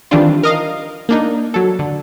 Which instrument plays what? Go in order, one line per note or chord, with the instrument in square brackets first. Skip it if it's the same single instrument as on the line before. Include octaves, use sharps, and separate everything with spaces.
[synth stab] D#3 E3 G3 C4 D4 F4
A#4 D#5 F5
A#3 D4 D#4
F#3 A4
D3